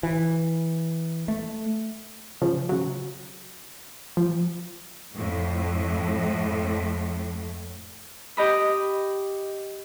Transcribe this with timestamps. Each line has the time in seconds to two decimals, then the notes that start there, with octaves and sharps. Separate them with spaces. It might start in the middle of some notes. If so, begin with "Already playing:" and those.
0.03 E3
1.28 A3
2.42 C#3 F3
2.69 C#3 F#3
4.17 F3
5.14 F2 A2
8.37 G4 D#5 B5